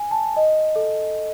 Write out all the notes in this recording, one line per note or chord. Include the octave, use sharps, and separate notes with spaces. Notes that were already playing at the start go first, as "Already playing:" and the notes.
Already playing: G#5
A5
D#5
A4